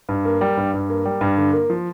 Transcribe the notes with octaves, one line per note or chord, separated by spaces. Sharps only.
G2
A#3
G3
G2
G2
A#3
G3
G2
D3
A#3
F3